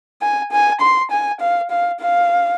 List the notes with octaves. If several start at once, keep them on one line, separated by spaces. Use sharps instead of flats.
G#5
G#5
C6
G#5
F5
F5
F5